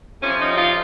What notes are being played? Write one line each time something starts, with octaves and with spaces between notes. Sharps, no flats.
F2 C3 F3 C#4
D#4
F4